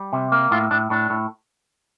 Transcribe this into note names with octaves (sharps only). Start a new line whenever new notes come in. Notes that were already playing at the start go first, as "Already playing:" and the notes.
Already playing: G3
C3
A#3
A2 F4
A2 D4
A2 D4
A2